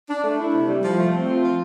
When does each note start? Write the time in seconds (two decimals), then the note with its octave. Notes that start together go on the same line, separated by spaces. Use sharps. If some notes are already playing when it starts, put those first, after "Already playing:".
0.09 D4
0.23 A3
0.38 E4
0.53 C3
0.68 G3
0.83 F3
0.98 A3
1.13 C4
1.28 F4
1.43 F3